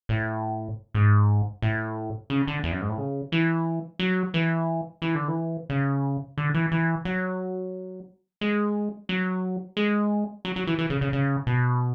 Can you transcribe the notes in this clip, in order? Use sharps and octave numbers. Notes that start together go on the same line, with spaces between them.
A2
G#2
A2
C#3
D3
E2
F#2
G#2
A2
C#3
E3
F#3
E3
E3
D3
E3
C#3
D3
E3
E3
F#3
G#3
F#3
G#3
F#3
F#3
E3
E3
C#3
C#3
C#3
B2